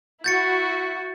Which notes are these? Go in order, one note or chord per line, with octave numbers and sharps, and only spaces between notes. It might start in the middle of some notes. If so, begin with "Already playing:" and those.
E4 F#4 G6 A6 C#7